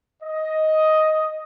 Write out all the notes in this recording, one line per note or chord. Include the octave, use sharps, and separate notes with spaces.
D#5